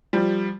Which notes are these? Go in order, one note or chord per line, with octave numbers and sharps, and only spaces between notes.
F3 G3